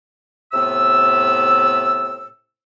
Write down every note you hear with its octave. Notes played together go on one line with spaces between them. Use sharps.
A2 C3 B3 E6